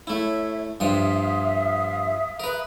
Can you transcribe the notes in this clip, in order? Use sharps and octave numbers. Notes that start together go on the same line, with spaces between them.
A3 E4 C#5 E5
G2 F3 E5 F5 C6 D#6
A#4 B4